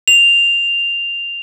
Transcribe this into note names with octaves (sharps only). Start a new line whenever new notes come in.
F7